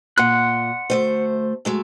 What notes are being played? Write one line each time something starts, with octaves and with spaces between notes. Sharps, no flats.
A#2 F#5 C6 F#6
D2 A3 C5
F#2 G#3 A3